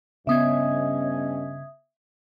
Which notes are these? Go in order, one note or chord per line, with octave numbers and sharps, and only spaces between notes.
G2 C#3 B3 C#4 D#5 E5 D#6 G#6